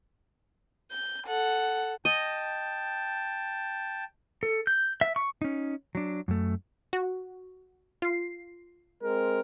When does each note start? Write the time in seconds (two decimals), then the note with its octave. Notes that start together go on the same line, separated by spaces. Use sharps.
0.91 G6
1.25 A4 F#5
2.05 D#5 G5 A5
4.43 A4
4.67 G6
5.01 E5
5.16 C#6
5.42 C#4 D#4
5.95 F#3 D4
6.28 F#2 A3
6.93 F#4
8.02 F4 C7
9.02 G#3 C4 A#4